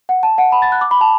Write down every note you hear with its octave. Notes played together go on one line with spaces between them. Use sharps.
F#5
A5
F#5
B5
A6
F#6
D6
B5
A5